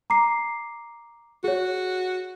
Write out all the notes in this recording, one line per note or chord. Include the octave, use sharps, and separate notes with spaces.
A#5 D6 C7
F#4 G#4 C#5